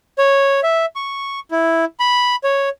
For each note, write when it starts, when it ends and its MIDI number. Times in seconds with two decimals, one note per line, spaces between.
0.18 0.60 73
0.63 0.86 76
0.96 1.40 85
1.51 1.85 64
2.00 2.36 83
2.44 2.69 73